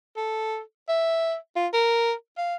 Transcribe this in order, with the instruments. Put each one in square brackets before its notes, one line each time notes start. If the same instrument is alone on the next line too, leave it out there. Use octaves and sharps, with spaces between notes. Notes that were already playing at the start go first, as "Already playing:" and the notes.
[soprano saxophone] A4
E5
F4
A#4
F5